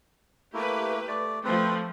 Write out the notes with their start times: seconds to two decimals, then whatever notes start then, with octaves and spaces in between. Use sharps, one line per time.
0.54 A3 A#3 E4 G4 B4
1.08 A3 D5
1.44 F3 A3 C4 B4